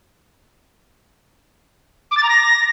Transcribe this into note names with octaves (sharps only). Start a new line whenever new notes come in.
D6
A6
A#5
A#6